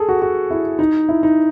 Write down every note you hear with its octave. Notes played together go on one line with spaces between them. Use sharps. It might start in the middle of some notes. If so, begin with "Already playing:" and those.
Already playing: G#4 A4
F#4
F#4
E4
D#4
E4
D#4